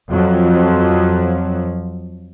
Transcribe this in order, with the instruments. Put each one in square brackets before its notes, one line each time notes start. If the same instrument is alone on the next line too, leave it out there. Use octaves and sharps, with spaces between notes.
[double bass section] F2 F3 F#3